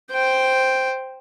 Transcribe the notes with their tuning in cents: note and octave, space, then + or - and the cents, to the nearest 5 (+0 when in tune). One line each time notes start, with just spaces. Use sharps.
C5 +0 G5 +0